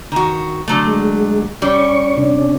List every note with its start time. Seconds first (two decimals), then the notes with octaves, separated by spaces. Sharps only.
0.12 D#3 F#4
0.68 D3 F#3 A3
0.87 G#3
1.62 G3 C#4 C#6
2.17 C3 C#4 D4